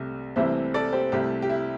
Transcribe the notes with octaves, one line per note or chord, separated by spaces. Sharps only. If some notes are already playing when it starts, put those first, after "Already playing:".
Already playing: C2 C3 A3
C2 C3 E3 A3 E4 C5 E5
A4 D5
G4 C5
C2 C3 A3 E4 G4
G4
E4